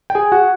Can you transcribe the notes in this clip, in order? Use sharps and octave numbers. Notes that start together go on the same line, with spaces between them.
G5
G#4 G#5
F#4 F#5